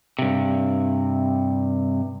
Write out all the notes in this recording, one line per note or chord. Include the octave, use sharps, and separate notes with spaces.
G2 C3